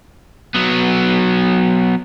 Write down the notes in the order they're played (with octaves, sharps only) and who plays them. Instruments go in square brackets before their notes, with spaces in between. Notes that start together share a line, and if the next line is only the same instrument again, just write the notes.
[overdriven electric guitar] F#3 B3